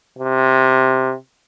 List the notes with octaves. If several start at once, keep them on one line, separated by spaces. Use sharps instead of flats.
C3